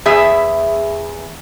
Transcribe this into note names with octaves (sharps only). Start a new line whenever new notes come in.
E2 G#4 E5